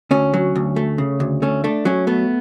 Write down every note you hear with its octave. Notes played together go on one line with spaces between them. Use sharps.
D2 C#4
F#3
D2
A3
C#3
D2
A3 C#4
A3 D4
F#3 C#4
A3 B3